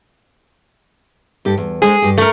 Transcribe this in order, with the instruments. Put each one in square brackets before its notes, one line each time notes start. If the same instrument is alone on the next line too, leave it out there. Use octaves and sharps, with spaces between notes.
[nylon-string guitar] G2 G4 A4
E2
[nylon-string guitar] G#3 C5 [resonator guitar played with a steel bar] G#4
[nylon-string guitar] G2 G4
[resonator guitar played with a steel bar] A3 A#4